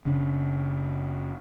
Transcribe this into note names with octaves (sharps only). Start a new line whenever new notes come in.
F#1 C#3 C#4 D4